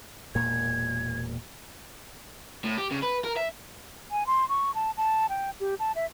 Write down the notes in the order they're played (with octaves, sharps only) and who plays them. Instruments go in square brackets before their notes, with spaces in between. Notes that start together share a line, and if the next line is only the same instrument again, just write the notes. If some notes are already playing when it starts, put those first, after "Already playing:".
[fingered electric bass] E1 A#2 A#3 [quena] G#6
[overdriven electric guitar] A2
G4
C#3
B4
A#4
E5
[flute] G#5
C6
C#6
A5
A5
G5
G4
A5
E5